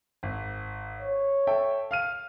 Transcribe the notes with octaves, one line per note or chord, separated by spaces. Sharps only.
G#1
C#5
A4 E5 G5
F5 F6 D#7